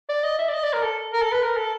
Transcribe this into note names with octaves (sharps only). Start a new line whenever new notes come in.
D5
D#5
E5
D5
D#5
D5
A#4
A4
A#4
A4
B4
A#4
A4